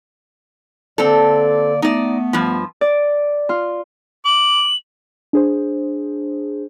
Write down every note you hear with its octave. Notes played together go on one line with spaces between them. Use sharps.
D3 A#3 C4 A4 D5
A3 B3 D#4 D5
G2 F3
D5
F4
D6 F#7
D4 G#4 C5